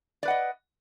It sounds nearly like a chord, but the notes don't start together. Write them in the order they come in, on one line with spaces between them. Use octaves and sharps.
D5 B4 F#5 D#5